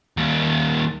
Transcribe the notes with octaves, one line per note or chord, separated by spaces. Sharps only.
D#2 G3